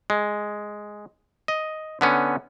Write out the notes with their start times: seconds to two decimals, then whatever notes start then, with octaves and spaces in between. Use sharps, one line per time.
0.10 G#3
1.48 D#5
2.01 D3 B3 C#4